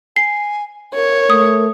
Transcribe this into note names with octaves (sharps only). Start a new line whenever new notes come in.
G#5 C7
A#4 C#5
A3 D#6